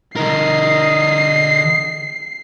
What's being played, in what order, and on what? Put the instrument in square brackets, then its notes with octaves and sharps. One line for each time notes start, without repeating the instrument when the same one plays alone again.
[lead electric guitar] D3 A#4 [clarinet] D#5 [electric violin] C7